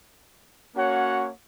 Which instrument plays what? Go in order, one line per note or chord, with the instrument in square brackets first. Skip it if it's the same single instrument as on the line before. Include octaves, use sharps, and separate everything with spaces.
[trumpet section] A#3 C#4 F#4 C#5 F#5